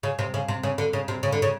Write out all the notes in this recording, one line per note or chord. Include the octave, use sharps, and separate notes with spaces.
C#3
C3
C#3
C3
C#3
D3
C#3
C3
C#3
D3
C#3